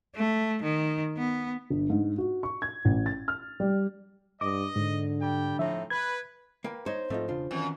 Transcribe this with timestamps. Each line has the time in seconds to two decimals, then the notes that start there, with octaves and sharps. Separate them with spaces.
0.16 A3
0.63 D#3
1.17 B3
1.70 G1
1.90 G#2
2.18 F#4
2.43 C#6
2.62 G#6
2.85 A1
3.06 A6
3.28 F6
3.60 G3
4.41 G2 D#5 D6
4.76 G#2 D3
5.20 G3 G5
5.59 A2 F3 C4 D#4 E5
5.90 B4 G#6
6.64 A#3 B4 G5
6.86 D#4 C5 C#5
7.10 G#2 F3 A3 C4 D#4 F4
7.29 E1 C#3 D4 F4
7.51 F#2 D#3 E3 C4